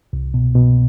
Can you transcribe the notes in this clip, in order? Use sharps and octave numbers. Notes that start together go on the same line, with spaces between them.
C2
B2
B2